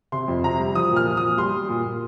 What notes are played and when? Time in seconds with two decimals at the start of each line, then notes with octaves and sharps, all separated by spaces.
0.12 C3 C6
0.28 F2
0.44 C3 A#5
0.59 G3
0.75 F3 D#6
0.91 A#2
0.96 F6
1.06 F3
1.17 A#2 D#6
1.37 G3 C6
1.54 G3
1.69 A#2
1.85 A#2